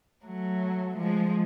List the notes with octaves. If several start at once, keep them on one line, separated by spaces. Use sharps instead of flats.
F#3 A3
F3 G#3